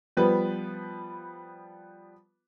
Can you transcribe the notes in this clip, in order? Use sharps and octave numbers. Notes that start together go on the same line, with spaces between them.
F3 G3 B3 B4